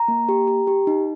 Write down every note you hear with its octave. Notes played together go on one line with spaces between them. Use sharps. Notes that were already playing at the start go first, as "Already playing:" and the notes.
Already playing: A#5
A#3
G4
G4
G4
D#4